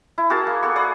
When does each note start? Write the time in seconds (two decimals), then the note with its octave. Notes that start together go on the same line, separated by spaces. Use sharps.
0.18 E4
0.30 F#4 G#4 A#4 A5
0.47 A#3
0.63 B3 A4 C#6
0.76 G#4 D5 F#5